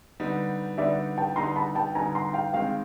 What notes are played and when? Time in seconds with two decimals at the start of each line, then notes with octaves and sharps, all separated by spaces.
0.20 D3 G3 B3 D#4
0.78 D3 G3 B3 D#4 D5 E5
1.18 G5 A5
1.36 D3 G3 B3 D#4 A#5 C6
1.56 A5 B5
1.75 G5 A5
1.95 D3 G3 B3 D#4 G#5 A#5
2.15 A#5 C6
2.34 F5 G5
2.53 C3 D#3 G#3 C4 D#4 F5 G5